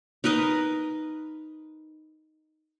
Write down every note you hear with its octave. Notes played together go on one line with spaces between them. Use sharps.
D#4 A#4 B4 D#5